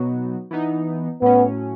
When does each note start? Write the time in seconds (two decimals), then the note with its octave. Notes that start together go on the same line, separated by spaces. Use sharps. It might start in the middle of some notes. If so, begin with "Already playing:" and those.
Already playing: B2 F#3 B3 D#4 F#4
0.51 E3 B3 D#4
1.22 A2 F#3 B3 C#4